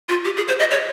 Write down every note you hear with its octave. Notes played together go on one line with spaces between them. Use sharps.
F4
G4
G#4
C5
D#5
C#5